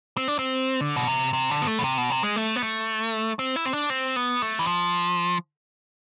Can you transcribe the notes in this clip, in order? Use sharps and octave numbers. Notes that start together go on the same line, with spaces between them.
C4
D4
C4
D3
B2
C3
C3
D3
B3
A3
B2
C3
B2
C3
G#3
A3
B3
A3
C4
E4
C4
D4
C4
B3
A3
E3
F3